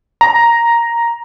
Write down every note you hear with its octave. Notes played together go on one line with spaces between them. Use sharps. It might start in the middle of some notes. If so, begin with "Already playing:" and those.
A#5